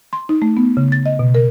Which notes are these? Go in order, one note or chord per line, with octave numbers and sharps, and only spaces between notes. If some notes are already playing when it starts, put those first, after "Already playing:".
C6
D#4
A3
B3
C#3
A6
D#5
B2
A#4